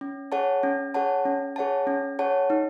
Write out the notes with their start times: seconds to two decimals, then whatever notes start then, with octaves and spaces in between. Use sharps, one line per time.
0.01 C#4
0.32 G#4 C#5 F#5 A5
0.63 C#4
0.94 G#4 C#5 F#5 A5
1.25 C#4
1.56 G#4 C#5 F#5 A5
1.87 C#4
2.19 G#4 C#5 F#5 A5
2.50 D#4